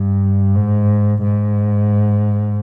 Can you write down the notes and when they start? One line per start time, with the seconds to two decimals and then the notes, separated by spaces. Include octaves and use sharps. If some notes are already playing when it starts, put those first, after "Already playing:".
Already playing: G2
0.55 G#2
1.22 G#2